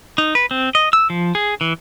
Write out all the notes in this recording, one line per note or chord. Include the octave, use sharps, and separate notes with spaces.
D#4
B4
C4
D#5
E6
F3
G#4
E3